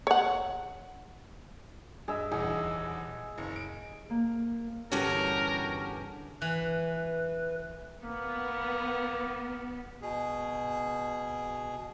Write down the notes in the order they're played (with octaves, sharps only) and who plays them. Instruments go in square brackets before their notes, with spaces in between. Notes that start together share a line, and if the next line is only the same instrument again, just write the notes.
[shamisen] C#5 F#5
[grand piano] G2 [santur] G#4 D#5 E5
[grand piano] D#1 E2 [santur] G#4
[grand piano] F#1
D7
[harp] A#3
[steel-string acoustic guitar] E2 G2 D3 [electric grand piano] C#4 F#4 G4 [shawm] A#4
[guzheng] E3 [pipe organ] B4
[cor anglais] A#3 [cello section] B3
[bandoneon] B2 G#4